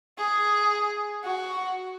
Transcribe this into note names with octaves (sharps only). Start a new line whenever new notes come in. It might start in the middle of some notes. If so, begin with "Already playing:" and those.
G#4
F#4